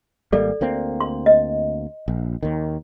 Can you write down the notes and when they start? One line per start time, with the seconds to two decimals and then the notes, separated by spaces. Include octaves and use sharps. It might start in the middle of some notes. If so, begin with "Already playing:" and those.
0.32 G#1 G3 A#3 A4 D5
0.61 D2 A#3 C4
1.00 C6
1.26 D#5
2.08 A#1
2.43 D#2 D#3